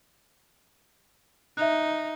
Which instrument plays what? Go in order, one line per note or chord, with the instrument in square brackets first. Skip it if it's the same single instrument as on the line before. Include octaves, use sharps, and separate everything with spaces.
[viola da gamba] D#4 [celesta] E5 F#6